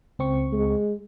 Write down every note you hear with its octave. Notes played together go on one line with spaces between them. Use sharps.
C#2 C4 C#6
G#3